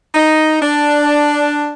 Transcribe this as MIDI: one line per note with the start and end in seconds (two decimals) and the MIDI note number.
0.14 0.58 63
0.61 1.73 62